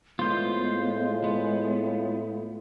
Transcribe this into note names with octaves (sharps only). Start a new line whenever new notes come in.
A2 G#3 B3 F4 C5
B3